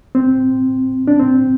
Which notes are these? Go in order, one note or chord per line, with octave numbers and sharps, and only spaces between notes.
C4
D4
C4